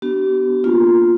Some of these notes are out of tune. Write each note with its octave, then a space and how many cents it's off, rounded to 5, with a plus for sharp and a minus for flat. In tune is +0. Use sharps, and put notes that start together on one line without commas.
B3 +0 D4 +0 G4 -40
A#3 +0 D4 +0 F4 +0